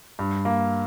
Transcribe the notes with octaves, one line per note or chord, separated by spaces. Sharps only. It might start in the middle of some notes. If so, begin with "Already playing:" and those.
G2
A#3